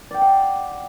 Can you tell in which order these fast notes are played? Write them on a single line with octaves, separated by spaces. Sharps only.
D5 G5 C6 F#5